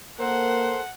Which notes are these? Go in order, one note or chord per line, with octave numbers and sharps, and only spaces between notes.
A#3 A4 A#4 C5 F#5